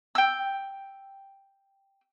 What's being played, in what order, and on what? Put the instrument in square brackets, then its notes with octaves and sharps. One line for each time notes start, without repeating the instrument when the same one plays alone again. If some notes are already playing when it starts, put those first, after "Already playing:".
[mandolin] G5 E6